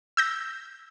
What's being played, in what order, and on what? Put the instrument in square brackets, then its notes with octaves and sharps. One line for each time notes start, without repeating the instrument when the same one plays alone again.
[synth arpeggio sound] E6 G6 A#6